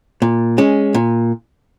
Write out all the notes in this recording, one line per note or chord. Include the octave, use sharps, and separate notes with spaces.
A#2
G#3 C#4
A#2